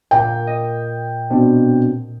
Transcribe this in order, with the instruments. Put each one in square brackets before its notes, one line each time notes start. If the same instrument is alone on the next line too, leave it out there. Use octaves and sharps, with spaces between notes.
[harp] A#2 [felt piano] G5
[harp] D#5
[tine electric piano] B2 C4 D4